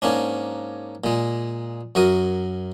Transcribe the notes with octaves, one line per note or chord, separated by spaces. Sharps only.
G#2 A#3 C#4 D4
A#2 G#3
F#2 F#4 A#4 D#6